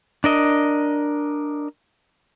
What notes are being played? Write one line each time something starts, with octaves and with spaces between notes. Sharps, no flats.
D4 A#4 D#5